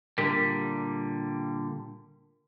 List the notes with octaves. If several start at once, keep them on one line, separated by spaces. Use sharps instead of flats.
A#2 D3 G3 A#4 B6